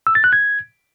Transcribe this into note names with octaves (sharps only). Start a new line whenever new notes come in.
E6
A6
F#6
G#6